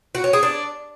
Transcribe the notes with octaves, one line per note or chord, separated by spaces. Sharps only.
F#4
C#4
G#4
D4